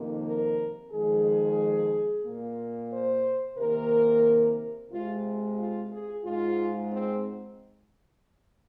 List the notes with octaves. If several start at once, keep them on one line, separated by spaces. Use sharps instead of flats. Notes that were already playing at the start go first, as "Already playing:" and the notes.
Already playing: F2 C3 D#3 A#3
A#4
F2 D#3 G#3 G#4
A#2 A#3
C5
C3 D#3 A#3 A#4
C3 G#3 F4
F4
G#4
G#2 G#3 F4
C4